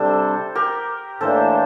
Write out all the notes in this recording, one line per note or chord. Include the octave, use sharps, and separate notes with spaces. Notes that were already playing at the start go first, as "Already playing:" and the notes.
Already playing: C3 G3 D4 A4 C5
G4 A#4
A2 E3 A#3 D4 A4 C5